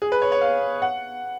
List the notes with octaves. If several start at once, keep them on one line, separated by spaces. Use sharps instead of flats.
G#4
B4
C#5
C#5
F5
F#5